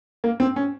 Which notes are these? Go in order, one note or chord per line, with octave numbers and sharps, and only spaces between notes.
A#3
C4
C#4